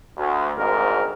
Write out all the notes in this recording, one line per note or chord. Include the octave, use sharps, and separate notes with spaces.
D2
G#1 D2 G#2 A#4